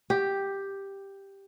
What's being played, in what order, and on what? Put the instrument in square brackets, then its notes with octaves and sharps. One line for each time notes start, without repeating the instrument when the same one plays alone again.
[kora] G4